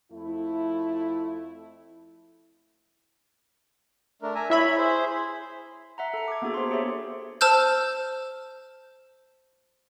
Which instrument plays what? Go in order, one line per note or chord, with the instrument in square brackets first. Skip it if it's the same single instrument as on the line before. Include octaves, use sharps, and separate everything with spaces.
[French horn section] F2 A3 E4
[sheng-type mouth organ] A3 D4 A#4
E5 G#5 A#5
[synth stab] E4 E5 B5 [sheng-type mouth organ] C#5
[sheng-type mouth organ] G#4 C5
[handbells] E5 F#5 A#5
A4 A#5
D6 G#6
A#3 B3 D4 F#4 G#4 A4
C5 C6
G4 G#4 C#5 E5
[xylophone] C5 A5 E6 F6 G6